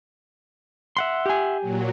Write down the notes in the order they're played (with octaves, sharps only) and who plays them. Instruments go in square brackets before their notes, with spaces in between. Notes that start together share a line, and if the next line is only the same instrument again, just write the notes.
[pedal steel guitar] E5 F#5 C6
[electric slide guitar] G4 G#5
[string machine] A#2 F#3